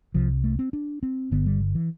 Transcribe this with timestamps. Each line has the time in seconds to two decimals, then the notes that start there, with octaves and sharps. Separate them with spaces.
0.14 C2 C3 F3
0.44 A3
0.59 C4
0.73 D4
1.03 C4
1.31 G1 G2 D3 B3
1.46 G3
1.61 D3
1.75 E3